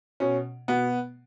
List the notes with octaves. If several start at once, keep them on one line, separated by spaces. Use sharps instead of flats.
B2 C#4
B2 B3